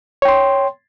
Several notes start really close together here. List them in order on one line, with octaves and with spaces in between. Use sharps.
C#5 G5 C6